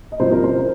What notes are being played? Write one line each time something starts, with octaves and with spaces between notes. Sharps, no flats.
D#5
C2 A#2 F3 A#3 C#4 C5
A#4
C5
F3